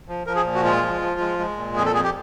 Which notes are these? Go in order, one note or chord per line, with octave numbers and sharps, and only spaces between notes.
F3
F3 A#4
G#4
A#2
F#4
G#3 F4
F3
F3
G#3
G#3
A#2
F2 G#4
A4
F2 G#4
G4